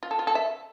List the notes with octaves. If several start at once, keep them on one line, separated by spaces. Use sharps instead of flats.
F4
A4
F4
A4
E5